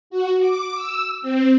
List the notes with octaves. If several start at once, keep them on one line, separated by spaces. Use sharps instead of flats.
F#4
D6
E6
C4